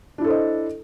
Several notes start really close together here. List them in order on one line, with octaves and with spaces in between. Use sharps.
D4 E4 A4 C5 D#5